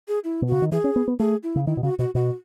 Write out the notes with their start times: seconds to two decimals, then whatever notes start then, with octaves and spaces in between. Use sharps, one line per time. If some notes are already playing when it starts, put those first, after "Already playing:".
0.08 G#4
0.24 E4
0.42 B2
0.48 C#3 F#4
0.62 D#3
0.72 E3 G#4
0.84 C#4
0.96 B3
1.08 B3
1.19 A3 G#4
1.43 E4
1.56 C#3
1.67 D#3 E4
1.77 B2
1.83 C#3 F#4
1.99 B2 F#4
2.15 B2 F#4